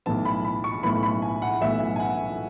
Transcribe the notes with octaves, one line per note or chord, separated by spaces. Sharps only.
B1 A2 E3 B3 A5
B5
B5
C#6
B1 A2 E3 B3 B5
B5
G#5
F#5
B1 A2 E3 B3 E5
G#5
F#5